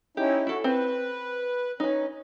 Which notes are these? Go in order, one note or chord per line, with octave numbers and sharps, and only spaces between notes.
C#4 D#4 E4 G4
E4 F#4 A4
C4 B4 C5
C#4 D#4 B4